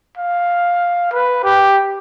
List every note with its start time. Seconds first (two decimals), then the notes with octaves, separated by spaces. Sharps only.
0.17 F5
1.13 B4
1.44 G4